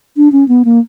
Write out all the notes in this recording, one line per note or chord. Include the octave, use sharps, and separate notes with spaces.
D4
C#4
B3
A#3